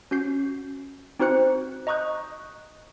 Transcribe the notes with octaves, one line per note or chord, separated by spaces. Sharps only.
C#4 F#4 G6 C7
C4 D#4 F#4 C5 F#6 C#7
D#5 A#5 C#6 D#6 F#6 G6